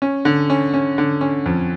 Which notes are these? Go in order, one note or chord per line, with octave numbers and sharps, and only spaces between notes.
C#4
D3
C#4
C#4
D3
C#4
F2